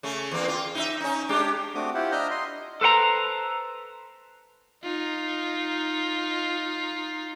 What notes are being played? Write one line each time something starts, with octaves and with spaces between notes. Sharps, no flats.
C#3 A3
E2 A#3
F4
D#4 E4 E5
C#4 D#4
G#3 D4 G4
A3 C4 D4 F#4 D6 D#6
E4 F4 G4 C5 F#5
D4 D#5 E5 A#5 F6 G6
D#5 C6
A4 B4 C5 F#5 A#5
D#4 F4